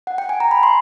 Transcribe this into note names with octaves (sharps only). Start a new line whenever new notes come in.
F#5
G5
G#5
A#5
B5
C6